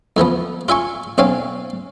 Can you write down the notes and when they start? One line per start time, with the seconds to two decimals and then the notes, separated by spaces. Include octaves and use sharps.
0.17 F2 E3 F3 B3
0.68 F4 E5 G#5 C#6
1.18 B1 C4 C#4 F5 G#5